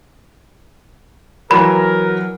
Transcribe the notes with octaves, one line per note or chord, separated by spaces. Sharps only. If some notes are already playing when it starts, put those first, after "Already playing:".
E3 F#3 A#4 B5